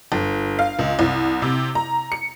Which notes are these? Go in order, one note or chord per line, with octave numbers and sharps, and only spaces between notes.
G1
F5
C#2
C2
C3
A#5
C#7